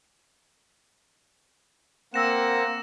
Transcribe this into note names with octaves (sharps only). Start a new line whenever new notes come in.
A#3 C4 F#5 E6 A#6 E7